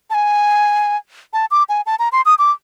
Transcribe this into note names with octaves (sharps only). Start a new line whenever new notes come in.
A5
G#5
A5
D6
G#5
A5
A#5
C6
D#6
D6